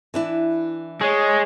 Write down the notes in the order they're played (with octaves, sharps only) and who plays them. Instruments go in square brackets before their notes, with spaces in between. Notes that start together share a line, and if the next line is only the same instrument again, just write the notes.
[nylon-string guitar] E3 D4 E4
[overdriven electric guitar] G#3 [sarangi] C#5